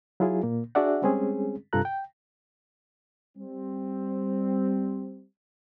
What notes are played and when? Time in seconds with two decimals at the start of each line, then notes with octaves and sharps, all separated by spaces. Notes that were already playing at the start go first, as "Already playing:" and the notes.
0.20 F#3 E4 F4 G#4
0.43 A#2 A#3
0.75 D4 F#4 G#4 D5 E5 F#5
1.02 G3 G#3 C4 C#4 G#4
1.73 G2 C3 F4 A4 A#5 F#6
1.85 G5
3.38 G3 C4